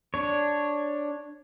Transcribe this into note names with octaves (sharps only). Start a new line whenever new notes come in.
D4 C#5